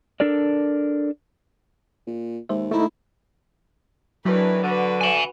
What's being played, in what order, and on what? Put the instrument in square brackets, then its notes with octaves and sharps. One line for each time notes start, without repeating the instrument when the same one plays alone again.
[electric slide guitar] D4 A4 A#4 D5
[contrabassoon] A#2
[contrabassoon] D#2 [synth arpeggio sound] G#3 C5 E5
[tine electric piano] A3 D#4 [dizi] E4
[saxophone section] A2 D#3 E3 [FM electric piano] F#3 [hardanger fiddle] D4 B4
[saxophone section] D3 [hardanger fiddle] F#4 B4
[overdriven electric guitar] G#5 B5